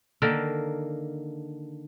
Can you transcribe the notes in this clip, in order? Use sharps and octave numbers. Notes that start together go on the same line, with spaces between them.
D3 D#3 A#3